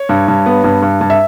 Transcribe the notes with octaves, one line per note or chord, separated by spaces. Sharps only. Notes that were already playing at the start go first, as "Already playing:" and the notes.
Already playing: C#5
G2
G2
B3
G2
G2
G2
E5